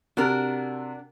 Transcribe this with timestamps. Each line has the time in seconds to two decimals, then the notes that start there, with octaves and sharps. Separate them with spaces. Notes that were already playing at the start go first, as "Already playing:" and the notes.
0.17 C3 D4 F#4 A#4